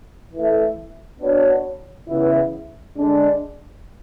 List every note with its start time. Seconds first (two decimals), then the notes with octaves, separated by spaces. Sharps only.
0.33 E3 A3 E4 A4 E5
1.21 B3 D4 F#4 C#5
2.08 C#3 E3 B3 E4
2.95 D3 G#3 D4